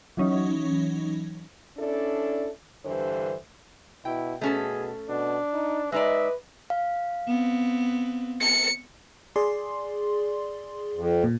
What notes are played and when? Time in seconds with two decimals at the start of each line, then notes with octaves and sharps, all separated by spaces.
0.17 E3 F#3 C#4 D#4
1.78 C#4 D4 E4 A4 D5
2.85 G2 D3 E3 C5
4.05 B2 E4 G5
4.41 B2 A3 C#4 G#4 A4
5.09 B2 D4
5.54 D#4
5.92 G#3 D#4 B4 D5 E5
6.70 F5
7.27 B3 C4
8.41 C#7
9.36 G#4 D5 C6
10.93 F2
11.24 A#2